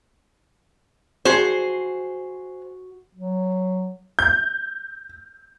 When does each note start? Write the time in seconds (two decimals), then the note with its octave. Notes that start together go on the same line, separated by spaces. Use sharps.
1.25 F#4 G#4 C5
3.15 F#3
4.19 G6